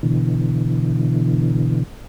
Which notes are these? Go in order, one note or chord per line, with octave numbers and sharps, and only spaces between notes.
B2 D3 E3